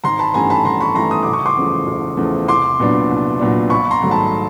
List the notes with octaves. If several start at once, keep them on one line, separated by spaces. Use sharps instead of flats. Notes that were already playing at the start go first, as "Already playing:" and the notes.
G#1 A#5 C6
A5 B5
G2 E3 A3 C#4 G#5 A#5
A5 B5
G#1 A#5 C6
B5 C#6
G2 E3 A3 C#4 A#5 C6
D#6
F#1 D6
C#6
C6 D6
E2 C#3 F3 A3
F#1
E2 C#3 F3 A3
C2 C6 D6
A#2 F#3 B3 D4
C2
A#2 F#3 B3 D4
A#1 B5 C#6
A#5 C6
G#2 D#3 F#3 A3
A5 B5